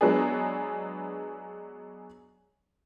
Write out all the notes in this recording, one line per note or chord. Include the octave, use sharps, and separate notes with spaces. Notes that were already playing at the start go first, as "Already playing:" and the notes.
F#3 G#3 B3 D4 G#4